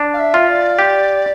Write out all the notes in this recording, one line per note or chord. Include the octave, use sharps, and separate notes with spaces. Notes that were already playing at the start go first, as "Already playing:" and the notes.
Already playing: D4
F5
E5
F4
D5
G4